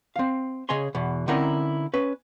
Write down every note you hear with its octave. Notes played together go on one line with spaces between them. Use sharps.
C4 F5
C#3 G#4 C#5 D#5 G#5 C6
E2 B2
D3 C4 C#4 D#4 E4 A#4
C#4 B4